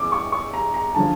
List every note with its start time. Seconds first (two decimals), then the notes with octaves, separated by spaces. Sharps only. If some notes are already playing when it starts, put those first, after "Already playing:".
Already playing: E2 E3 C#4 D6 E6
0.12 C#6
0.32 C#6
0.54 A#5
0.74 A#5
0.95 D3 F3 C#4 A5